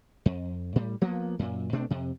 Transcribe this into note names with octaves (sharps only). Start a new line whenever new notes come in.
F2
A2 G3
F3 A#3 B3
F#2 A#2
B2 A3 C4 D4
F2 C3